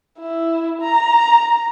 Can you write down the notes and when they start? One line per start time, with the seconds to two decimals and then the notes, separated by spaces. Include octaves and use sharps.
0.19 E4
0.81 A#5